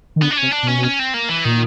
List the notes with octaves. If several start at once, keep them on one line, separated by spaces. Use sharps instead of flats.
D#3
D3 B3
D4
C#4
C3
D4
B2
C#4
C#4
C4
A#3
E3
A#2 D#3